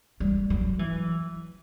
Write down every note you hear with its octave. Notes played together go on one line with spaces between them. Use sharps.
G3
F#3
E3